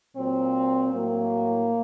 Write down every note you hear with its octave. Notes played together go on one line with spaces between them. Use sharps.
A#2 F#3 C4
A2 F#3 A#3